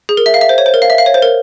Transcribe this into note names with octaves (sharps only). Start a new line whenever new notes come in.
G#4
A#4
E5
F5
E5
C5
C#5
C5
A#4
F5
E5
F5
C#5
C5
A#4